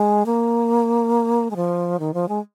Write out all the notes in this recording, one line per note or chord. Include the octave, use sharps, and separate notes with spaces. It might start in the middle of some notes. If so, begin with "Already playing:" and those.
Already playing: G#3
A#3
G#3
F3
D#3
F3
G#3